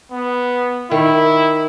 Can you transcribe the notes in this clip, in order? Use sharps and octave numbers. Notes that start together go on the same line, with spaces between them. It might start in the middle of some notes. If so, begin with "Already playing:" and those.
B3
D#3 E4